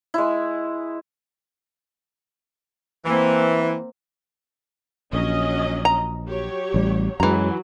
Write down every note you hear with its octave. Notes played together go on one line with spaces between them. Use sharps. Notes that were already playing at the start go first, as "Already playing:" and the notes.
G#3 E4
E3 A#3 C4
A#1 F#3 C#4 D#5
A#5
F#3 G4 C#5
A1 G3
F#2 E3 F#3 G#3 A#5